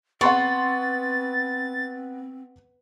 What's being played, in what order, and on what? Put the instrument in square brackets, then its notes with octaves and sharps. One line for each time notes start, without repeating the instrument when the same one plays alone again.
[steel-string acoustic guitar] B3 [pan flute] C4 [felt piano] F#5 C6 C#6 [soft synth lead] A6